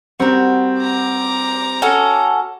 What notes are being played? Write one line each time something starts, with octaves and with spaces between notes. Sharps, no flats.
G3 C4 F#4 A#4
A#5 D6
C#4 F#4 A4